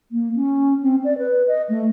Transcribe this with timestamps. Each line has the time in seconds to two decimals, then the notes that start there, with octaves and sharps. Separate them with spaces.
0.12 A#3
0.36 C#4
0.83 C4
1.04 D5
1.18 B4
1.47 D#5
1.69 A3